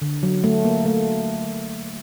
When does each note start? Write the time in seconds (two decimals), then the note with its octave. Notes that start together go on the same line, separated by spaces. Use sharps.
0.02 D3
0.23 F#3
0.44 A3
0.65 A#3
0.86 A3